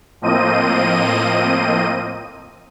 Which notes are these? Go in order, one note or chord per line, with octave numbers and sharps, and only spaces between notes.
A2 F3 A#3 C4 D#5 D#7